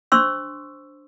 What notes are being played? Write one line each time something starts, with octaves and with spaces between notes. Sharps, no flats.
D4 C5 C6 C#6 E6